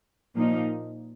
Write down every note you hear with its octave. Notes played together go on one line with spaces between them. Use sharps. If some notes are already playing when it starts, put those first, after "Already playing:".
A#2 F3 A#3 D#4